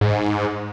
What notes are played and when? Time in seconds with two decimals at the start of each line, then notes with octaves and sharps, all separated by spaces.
0.01 G#2